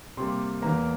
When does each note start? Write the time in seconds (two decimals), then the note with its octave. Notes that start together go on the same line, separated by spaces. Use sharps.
0.17 C3 G3 A#3 C6
0.62 E2 E3 A#3 A#5